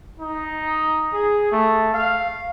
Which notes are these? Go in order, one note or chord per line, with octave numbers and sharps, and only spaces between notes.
D#4
G#4
A3
F5